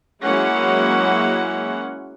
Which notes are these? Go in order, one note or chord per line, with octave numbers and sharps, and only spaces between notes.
F#3 G#3 A#3 C#4 E4 F#5